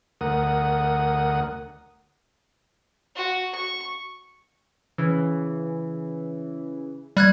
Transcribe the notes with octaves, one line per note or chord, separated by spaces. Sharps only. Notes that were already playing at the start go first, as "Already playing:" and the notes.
D2 A#4 F#5 D#6
F#4
C#6
C#3 E3
G3 F#6 G#6